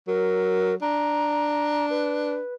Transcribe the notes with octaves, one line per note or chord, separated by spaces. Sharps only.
F#3 A#4
D4 A#5
B4